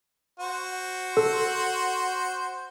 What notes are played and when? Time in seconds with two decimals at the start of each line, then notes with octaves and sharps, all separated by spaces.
0.40 F#4 C5
1.17 A4